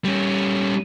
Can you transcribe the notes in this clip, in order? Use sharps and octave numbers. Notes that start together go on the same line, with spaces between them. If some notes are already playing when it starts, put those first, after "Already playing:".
G3 C#4